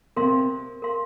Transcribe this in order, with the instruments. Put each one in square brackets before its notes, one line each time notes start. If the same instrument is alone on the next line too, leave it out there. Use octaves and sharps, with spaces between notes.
[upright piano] C3 [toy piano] A#4 F5 C6
[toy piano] A#4 F5 C6